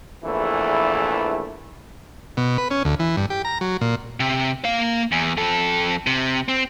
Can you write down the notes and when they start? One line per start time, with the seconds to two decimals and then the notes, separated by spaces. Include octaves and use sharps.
0.24 A#1 E2 E3 A3 E4
2.37 B2
2.58 B4
2.71 C#4
2.85 D2
3.00 E3
3.17 G2
3.30 G4
3.45 A#5
3.61 F#3
3.81 A#2
4.20 C3
4.65 A#3 F5
5.12 E2
5.37 F2 A4
6.07 C3
6.48 C4